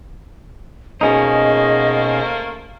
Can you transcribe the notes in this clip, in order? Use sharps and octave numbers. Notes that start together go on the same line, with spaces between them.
B2 A3 A#3 C#4 D#4 G#4 C5 D#5